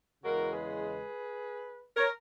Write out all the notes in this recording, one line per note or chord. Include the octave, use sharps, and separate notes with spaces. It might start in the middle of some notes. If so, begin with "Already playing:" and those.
E2 C#3 G#3 F#4 A#4
G#4 B4
A#4 C#5